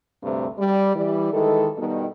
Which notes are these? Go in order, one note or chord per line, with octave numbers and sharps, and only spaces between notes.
D2 G2 C3 A3
G3
E3 G3
D#3 E3 G#3 A4
G2 B2 D#3